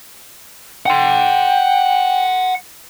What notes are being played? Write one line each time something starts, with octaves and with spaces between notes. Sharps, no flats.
F#5 G5 C6